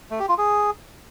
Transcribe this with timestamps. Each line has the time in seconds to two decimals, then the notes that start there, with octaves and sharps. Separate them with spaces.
0.11 A3
0.20 G4
0.29 F4
0.38 G#4